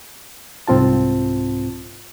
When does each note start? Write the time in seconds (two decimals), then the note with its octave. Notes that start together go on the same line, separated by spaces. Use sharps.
0.68 C2 G#2 C4 F4 A5